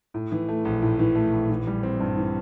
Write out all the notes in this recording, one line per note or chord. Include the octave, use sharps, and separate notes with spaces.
A2
E3
A3
A#1
A2
E3
A3
A#1
E3
G3
C4
G2
E3